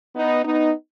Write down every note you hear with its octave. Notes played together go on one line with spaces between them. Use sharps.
B3 D#4
B3 D#4